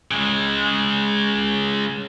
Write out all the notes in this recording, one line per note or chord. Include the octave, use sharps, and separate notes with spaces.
C#3 G#3